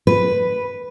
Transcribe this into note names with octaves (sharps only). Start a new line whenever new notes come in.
B4